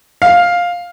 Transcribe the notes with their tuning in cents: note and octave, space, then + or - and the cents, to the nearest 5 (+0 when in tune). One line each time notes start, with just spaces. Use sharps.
F5 +10